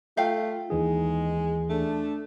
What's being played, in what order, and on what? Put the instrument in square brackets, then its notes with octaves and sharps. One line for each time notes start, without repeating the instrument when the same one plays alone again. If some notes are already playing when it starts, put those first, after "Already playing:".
[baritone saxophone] A3 [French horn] F4 [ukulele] F5 G5
[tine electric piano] D#2 E3 G#4 [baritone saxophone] G#3 [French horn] D#4
[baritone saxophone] A3 [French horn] D4